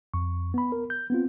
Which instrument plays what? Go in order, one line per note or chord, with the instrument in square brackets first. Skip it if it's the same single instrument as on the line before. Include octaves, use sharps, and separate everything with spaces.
[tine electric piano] F2 C#6
B3 B5
A#4
G6
B3 C4 F4